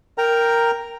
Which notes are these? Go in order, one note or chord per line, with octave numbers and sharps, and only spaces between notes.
A#4 G5 A#5